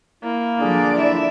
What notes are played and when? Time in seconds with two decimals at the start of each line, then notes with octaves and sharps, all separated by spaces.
0.23 A#3 E4
0.60 D3 F3 D4 G#4 D5
0.98 E4 E5